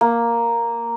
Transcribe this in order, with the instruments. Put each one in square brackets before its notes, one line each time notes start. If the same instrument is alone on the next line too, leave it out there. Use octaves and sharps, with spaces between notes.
[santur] A#3